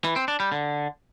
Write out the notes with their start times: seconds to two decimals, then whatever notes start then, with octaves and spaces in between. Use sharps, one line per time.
0.04 E3
0.16 C4
0.28 D4
0.40 G3
0.52 D3